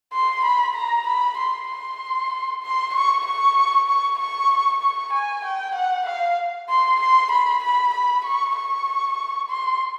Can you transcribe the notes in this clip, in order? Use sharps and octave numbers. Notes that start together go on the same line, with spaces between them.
C6
B5
A#5
B5
C6
C6
C6
C#6
C#6
C#6
C#6
C#6
G#5
G5
F#5
F5
C6
C6
B5
B5
B5
C#6
C#6
C6